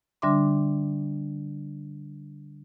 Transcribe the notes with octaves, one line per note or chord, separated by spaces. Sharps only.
D3 G3 D4 E5 C6 D6